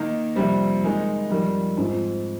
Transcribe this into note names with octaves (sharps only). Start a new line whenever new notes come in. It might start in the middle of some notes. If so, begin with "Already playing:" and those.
Already playing: D#3 A#3 D#4
F2 C3 G3 C4
D#3 G#3 D#4
F2 D#3 G3
G#2 F3 C4